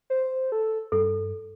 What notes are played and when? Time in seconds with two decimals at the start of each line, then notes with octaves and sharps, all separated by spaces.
0.10 C5
0.52 A4
0.92 G2 A4